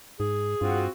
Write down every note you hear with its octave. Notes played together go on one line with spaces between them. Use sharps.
G#2 G#4
G2 C4 F4 F#4